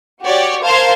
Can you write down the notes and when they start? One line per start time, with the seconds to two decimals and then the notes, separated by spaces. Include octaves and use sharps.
0.23 F#4 G4 C#5 D5
0.63 A#4 C5 F5 A5 C6 G#6